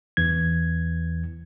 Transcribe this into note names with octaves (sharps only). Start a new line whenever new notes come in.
E2 E3 G#6